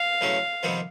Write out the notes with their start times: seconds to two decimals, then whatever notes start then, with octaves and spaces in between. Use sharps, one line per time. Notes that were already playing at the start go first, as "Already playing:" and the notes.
Already playing: F5
0.21 E2 C#3 F#3 A3 C#4
0.63 F2 C3 D#3 G3 B3